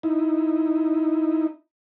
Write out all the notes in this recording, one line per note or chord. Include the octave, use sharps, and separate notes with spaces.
D#4 E4